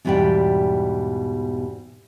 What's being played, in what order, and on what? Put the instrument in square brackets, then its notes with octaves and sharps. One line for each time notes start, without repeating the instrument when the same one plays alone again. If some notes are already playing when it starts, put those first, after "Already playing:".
[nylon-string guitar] E2 G#2 B2 G3 D5 G5